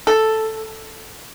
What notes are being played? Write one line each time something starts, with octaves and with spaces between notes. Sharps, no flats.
A4